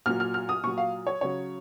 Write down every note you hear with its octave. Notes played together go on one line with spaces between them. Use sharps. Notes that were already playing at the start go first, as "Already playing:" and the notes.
A#2 F#3 F6
F6
F6
D#6
A#2 F#3 C#6
F5
C#5
C#3 F#3 C#5